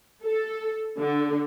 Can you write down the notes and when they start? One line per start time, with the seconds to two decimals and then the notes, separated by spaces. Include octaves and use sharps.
0.22 A4
0.98 D3